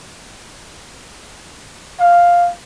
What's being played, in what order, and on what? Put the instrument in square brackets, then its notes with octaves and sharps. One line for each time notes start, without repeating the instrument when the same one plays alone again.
[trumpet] F5